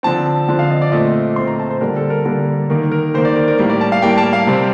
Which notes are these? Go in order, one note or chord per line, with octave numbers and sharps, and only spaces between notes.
D3 F3 C4 A5
D3 F3 C4
F5
D#5
D5
A#2 A3 C4 D#5
A#2 A3 C4 C6
A#5
A5
C5
D3 G3 A#3 A#4
A4
A#4
D3 G3 A#3 A#4
D#3 A#3
A#4
D#3 A#3 C5
D5
A#4
A#4
A2 G3 A#3
D5
A5
F5
A2 G3 A#3 G5
A5
F5
C3 G3 C4